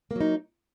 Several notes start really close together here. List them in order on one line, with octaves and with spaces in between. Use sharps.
A#3 F#3 D#4